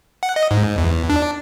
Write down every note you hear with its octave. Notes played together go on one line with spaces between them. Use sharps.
F#5
D#5
G#2
E2
D4